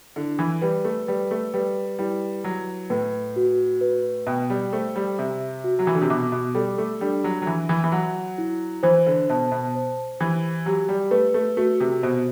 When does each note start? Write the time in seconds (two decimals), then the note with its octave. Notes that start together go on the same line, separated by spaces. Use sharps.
0.16 D3 E4
0.39 E3
0.62 G3 B4
0.85 A3
1.07 G3 B4
1.31 A3
1.54 G3 B4
1.99 G3 E4
2.44 F#3 B4
2.90 A2 B4
3.36 F#4
3.81 B4
4.27 B2 G5
4.50 G3
4.72 A3 C5
4.96 G3
5.19 C3 E5
5.64 F#4
5.79 F#3
5.87 E3
5.95 D3
6.02 C3
6.10 B2 D6
6.32 B2
6.55 G3 A4
6.78 A3
7.01 G3 D4
7.24 F#3
7.42 F#3
7.46 E3 E5
7.69 E3
7.84 E3
7.92 F#3 F#5
8.38 E4
8.83 E3 C5
9.07 D3
9.30 B2 A5
9.52 B2
9.75 C5
10.20 E3 G4
10.66 F#3 G4
10.89 G3
11.11 A3 B4
11.34 A3
11.57 A3 F#4
11.80 C3
12.02 B2 C5